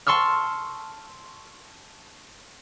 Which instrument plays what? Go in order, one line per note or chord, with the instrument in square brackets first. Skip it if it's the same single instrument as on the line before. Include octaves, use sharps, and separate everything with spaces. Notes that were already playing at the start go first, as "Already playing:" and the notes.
[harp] A5 C6 C#6 E6 F6